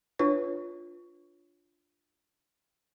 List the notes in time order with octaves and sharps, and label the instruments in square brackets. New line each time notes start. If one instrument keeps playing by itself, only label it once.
[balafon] D4 F4 B4 C#5